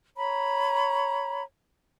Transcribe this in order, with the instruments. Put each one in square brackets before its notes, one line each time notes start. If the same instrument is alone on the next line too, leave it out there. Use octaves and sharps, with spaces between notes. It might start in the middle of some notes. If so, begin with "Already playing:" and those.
[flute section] C#5 A#5 B5